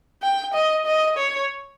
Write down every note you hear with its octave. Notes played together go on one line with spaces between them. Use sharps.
G5
D#5
D#5
C#5